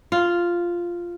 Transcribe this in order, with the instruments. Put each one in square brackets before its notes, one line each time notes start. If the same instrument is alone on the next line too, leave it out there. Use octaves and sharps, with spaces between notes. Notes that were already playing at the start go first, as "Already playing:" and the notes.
[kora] F4